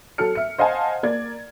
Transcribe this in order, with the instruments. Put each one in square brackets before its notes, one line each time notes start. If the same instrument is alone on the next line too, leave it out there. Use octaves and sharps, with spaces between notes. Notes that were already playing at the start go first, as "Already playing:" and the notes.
[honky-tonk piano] F#3 A4 F6 C#7
E5 C#7
C5 D#5 F5 F#5 G#5 A5
A#3 D5 G#6